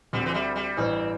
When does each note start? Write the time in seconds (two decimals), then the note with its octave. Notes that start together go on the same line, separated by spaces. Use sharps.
0.13 D2 D3 G3 C4
0.26 E3
0.34 G3
0.56 G3
0.77 A1 G2 E3 C4